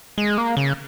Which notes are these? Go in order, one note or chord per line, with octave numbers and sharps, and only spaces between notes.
G#3
A#3
C#3